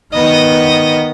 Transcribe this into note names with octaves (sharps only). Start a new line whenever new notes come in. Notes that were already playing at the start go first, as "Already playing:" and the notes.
D#3 B3 D#5